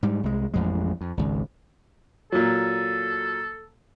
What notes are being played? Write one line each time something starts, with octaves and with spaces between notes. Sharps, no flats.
G#2 G3
C2 G#3
A1 F2 G#3
F2
G#1 C#2
A#2 F#3 A4